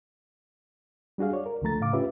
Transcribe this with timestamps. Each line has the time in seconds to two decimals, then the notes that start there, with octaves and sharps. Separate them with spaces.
1.18 G3 D4 F#4 G#4 F5
1.33 C#5 D5
1.46 A#4
1.62 C#2 D3 F3 A3 A#5 A6
1.80 A2 C#3 F5 D6
1.93 C#4 F4 G4 B4 E5